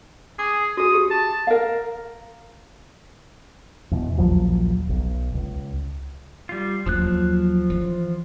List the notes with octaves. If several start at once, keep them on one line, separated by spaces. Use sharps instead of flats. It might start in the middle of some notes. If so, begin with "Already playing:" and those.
G#4 D6
F#4 G#4 D#6
G4 G#4
A5
A#4 F5
E2 B2
A#1 D#2 F3 F#3
B1
C#2
G3 F4
D#2 F3 F#3 F#6
E3